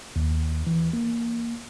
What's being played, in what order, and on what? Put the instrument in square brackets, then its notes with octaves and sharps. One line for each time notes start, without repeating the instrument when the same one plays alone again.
[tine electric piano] D#2
E3
A#3